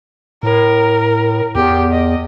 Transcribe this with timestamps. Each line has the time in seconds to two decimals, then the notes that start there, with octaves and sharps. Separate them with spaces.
0.43 A2 A#4
1.55 E2 G4
1.92 D#5